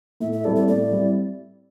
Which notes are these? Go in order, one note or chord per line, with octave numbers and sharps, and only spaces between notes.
A2 E5
E5
G3 C4 E4 A4 D5
D5
A2 D5
G3 C4 E4